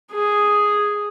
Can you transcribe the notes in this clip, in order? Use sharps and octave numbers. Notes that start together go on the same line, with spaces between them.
G#4